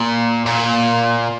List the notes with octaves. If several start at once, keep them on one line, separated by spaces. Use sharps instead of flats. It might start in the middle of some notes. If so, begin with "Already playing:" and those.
Already playing: A#2
A#2